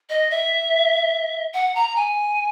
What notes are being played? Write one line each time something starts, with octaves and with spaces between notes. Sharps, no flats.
D#5
E5
F#5
A#5
G#5